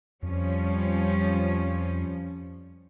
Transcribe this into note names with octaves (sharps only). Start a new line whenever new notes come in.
F2 F3 G3 C#4